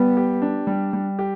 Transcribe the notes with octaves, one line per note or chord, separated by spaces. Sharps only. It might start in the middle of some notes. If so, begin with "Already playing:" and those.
Already playing: G3 B3
G4
D4
G3
G3
G4